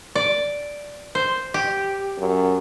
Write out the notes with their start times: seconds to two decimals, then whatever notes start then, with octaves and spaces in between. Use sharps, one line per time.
0.15 D5
1.15 C5
1.54 G4
2.18 F#2